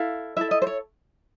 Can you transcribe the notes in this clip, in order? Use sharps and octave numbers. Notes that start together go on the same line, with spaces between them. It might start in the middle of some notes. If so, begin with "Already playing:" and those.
Already playing: E4 A4 F5
E4 A4 E5
D#5
C5
C#5